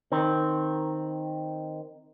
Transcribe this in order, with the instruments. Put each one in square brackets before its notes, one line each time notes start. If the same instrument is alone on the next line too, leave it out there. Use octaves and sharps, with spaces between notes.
[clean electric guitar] D#3 C4